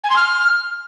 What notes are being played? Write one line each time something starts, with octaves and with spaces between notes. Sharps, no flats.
G#5
C6
F6